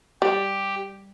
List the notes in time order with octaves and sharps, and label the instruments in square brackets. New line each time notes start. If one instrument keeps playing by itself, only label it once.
[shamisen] G3 [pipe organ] G4